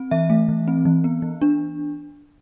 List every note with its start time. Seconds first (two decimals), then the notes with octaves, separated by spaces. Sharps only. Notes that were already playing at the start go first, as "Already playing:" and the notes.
Already playing: C4
0.11 E3 E5
0.30 A3
0.49 E3
0.68 C4
0.85 E3
1.04 B3
1.22 E3
1.42 D4